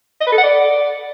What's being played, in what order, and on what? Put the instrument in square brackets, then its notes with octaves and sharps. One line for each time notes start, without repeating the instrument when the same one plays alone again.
[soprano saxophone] D#5
B4
A4
F#5
D5